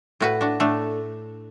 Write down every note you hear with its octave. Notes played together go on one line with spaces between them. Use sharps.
A2 F#4 B4
D4 F#4
A2 A3 D4